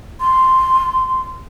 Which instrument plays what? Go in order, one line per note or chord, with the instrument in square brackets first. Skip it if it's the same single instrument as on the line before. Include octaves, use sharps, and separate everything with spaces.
[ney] C6